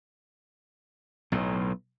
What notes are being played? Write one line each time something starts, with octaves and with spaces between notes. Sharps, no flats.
B1 A2